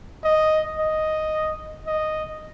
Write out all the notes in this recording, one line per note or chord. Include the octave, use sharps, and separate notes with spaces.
D#5
D#5
D#5